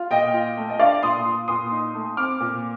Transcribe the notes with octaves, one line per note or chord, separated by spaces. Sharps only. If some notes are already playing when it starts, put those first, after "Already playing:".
Already playing: F4
A#2 D#5 G5
F4
A3
D#5
D4 D5 F5
A#2 C6 D#6
F4
A#2 C6 D#6
D#4
A3
C4 D6 F6
A#2